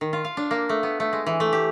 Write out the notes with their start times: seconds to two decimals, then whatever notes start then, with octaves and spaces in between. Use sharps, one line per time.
0.01 D#3
0.13 F4
0.25 F5
0.37 D4
0.51 A#3
0.69 A3
0.83 B3
1.00 A3
1.13 G#3
1.26 E3
1.40 A3
1.53 G4